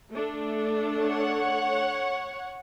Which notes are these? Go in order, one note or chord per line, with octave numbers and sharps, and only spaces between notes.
A3 D4 A4
C#5 F#5